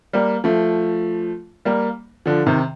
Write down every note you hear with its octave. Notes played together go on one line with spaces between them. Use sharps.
G3 A#3
F3 A3
G3 A#3
D3 F3
C3 D#3